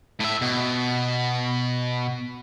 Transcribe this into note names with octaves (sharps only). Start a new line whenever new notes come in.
A2 E5
B2